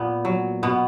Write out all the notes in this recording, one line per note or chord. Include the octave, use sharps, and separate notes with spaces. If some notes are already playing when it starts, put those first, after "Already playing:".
Already playing: A#2 B3
F#3
B2 B3